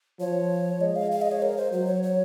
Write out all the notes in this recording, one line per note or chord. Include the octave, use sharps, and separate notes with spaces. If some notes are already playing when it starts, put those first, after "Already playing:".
F3 C#5
G#3 D#5
F5
F5
D#5
C#5
A#4
C5
F#3 C5
C#5
C#5